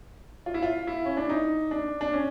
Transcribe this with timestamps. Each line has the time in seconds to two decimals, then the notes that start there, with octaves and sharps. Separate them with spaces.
0.46 F4
0.54 E4
0.62 F4
0.87 E4
1.05 C#4
1.17 D4
1.29 D#4
1.71 D4
2.01 D4
2.13 C#4